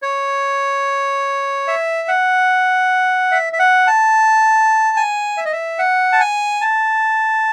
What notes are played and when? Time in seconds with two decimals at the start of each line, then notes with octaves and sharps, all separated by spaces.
0.02 C#5
1.67 E5
2.08 F#5
3.32 E5
3.53 E5
3.59 F#5
3.87 A5
4.97 G#5
5.37 E5
5.45 D#5
5.52 E5
5.79 F#5
6.12 A5
6.20 G#5
6.61 A5